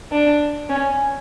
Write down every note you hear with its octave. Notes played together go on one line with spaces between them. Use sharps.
D4
C#4